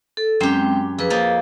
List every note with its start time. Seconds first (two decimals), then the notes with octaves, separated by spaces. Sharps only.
0.17 A4
0.40 F#2 G#3 C4 G4 G5
0.99 F2 G#4 B4
1.10 F3 A#3 D#5